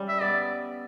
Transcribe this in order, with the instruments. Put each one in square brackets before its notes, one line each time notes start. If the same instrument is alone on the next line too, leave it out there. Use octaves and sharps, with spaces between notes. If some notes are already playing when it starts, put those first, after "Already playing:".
Already playing: [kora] G3 C#4
[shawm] E5
[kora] B3 [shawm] D5